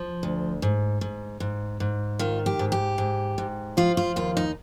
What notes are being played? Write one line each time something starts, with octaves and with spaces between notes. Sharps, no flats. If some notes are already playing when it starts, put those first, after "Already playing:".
Already playing: F3
D2
G#2
G#2
G#2
G#2
D#3 F4
G4
G#2
G4
G#2
G#2
F3 F4
F4
D#2 F4
D#4